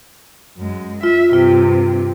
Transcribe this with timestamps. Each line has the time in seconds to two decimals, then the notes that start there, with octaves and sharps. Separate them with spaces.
0.57 F#2 G#3
1.03 F4 E5
1.33 G2 C3 F4